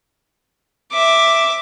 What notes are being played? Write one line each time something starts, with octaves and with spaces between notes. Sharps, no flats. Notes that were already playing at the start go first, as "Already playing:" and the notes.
E5 D6